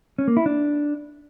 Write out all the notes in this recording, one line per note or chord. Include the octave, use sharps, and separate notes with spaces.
C#4
A#3
E4
D4